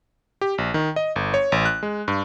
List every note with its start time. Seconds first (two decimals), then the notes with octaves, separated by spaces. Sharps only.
0.41 G4
0.58 A#1
0.74 D#3
0.96 D#5
1.16 G1
1.34 C#5
1.52 A1
1.65 F#6
1.83 G#3
2.08 G2